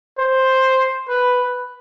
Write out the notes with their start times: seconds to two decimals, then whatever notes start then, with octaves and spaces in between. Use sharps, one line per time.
0.18 C5
1.08 B4